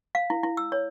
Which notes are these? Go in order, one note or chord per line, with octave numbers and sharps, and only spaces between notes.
F5
E4
E4
E6
C#5